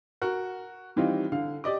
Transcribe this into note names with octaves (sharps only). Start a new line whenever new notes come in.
F#4 A#4
D#3 E3 G3 C4 D#4 F4
D3 F5
G4 D5 D#5 D6